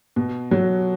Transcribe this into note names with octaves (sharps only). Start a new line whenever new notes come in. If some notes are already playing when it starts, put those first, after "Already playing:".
B2
F#3